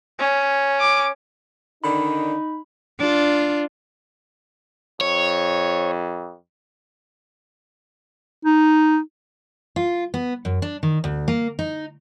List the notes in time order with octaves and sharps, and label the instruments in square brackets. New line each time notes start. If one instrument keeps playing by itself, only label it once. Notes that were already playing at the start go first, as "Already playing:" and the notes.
[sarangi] C#4
[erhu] D6
[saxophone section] D3 D#3 D5 [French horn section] D#4 [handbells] B5
[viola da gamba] D4 F4
[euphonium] F2 [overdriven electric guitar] C#5
[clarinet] D#4
[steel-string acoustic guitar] F4
B3
F#2
D4
D#3
D2
A#3
D#4